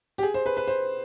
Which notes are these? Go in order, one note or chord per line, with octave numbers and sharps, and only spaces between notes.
G4
G#4
C5
B4
B4
C5